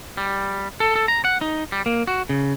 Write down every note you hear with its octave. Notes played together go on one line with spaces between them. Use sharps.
G3
A4
A4
A#5
F#5
D#4
G3
A#3
F#4
C#3